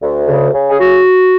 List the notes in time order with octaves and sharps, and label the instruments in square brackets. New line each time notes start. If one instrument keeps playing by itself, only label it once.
[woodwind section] D2
C#3
C#3
G#4
F#4